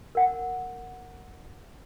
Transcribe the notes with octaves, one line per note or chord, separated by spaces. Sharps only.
A#4 F#5